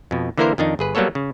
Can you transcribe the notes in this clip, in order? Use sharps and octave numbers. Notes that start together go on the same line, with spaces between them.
F2 B2
D3 E3 A#3 E4 A#4 C5
F2 D#3 D4 D#4
G1 G#4 B4
F#3 G3 A#3 B3 A4 C#5
C#3